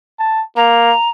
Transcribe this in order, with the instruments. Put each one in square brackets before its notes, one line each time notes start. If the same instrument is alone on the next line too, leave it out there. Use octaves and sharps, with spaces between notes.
[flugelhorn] A5
[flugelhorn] A#3 [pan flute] A#5